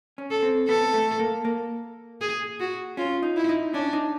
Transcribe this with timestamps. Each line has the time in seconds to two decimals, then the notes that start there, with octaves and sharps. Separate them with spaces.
0.18 C#4
0.31 A4
0.43 C4
0.68 B3 A4
0.94 A3
1.19 A#3
1.45 A#3
2.21 G#4
2.60 F#4
2.97 C#4 F4
3.23 D#4
3.36 E4
3.49 D#4
3.74 C#4 D4
3.93 D#4